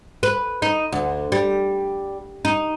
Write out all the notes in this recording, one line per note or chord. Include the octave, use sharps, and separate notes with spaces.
B4
D#4
D2
G3
D#4